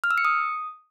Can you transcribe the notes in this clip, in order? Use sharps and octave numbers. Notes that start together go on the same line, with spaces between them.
F6
E6
C#7
D#6